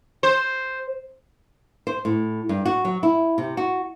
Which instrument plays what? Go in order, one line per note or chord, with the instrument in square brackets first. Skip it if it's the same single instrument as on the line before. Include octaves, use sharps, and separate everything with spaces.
[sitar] C5
[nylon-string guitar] C5
A2
G2
F#4
F#3
E4
C3
F#4